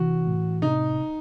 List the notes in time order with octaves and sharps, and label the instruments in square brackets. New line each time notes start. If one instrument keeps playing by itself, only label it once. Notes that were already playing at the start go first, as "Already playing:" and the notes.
Already playing: [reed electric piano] C3 E3 [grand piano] F#4
[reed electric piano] A2
[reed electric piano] C3 [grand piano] D#4